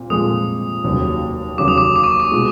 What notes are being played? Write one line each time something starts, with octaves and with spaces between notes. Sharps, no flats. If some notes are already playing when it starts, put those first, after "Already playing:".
Already playing: A#2 C4
A#2 F3 G#3 C4 D#6
F1 D#2 C#3 F#3 A#3
F1 D#2 C#3 F#3 A#3 D6
D#6
D6
D6
C#6
C#6
B2 G#3